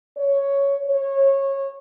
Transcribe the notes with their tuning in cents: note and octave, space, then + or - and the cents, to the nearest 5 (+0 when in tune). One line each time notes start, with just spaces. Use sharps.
C#5 +5
C#5 -20